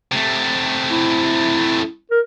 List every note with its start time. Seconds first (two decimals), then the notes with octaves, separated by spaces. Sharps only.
0.12 C3 A3
0.90 E4
2.11 A#4